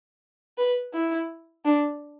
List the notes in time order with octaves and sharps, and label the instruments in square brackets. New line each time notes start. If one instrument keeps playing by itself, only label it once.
[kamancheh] B4
E4
D4